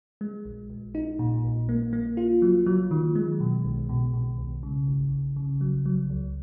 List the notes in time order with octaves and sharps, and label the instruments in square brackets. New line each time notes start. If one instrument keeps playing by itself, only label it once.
[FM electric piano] G#3
A#1
A#1
D#4
A#2
A#1
A#3
A#3
F4
F#3
F#3
D#3
G#3
B2
B1
B2
B2
B1
C#3
G#1
G#1
C#3
F#3
F#3
C#2